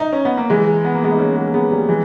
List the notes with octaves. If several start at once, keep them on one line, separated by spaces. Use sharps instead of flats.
D#4
C#4
B3
A#3
E3 G#3
B3
A#3
G#3 B3
D#4
A#3 C#4
G#3 B3
A#3
G#3 B3
G3 A#3
E3 G#3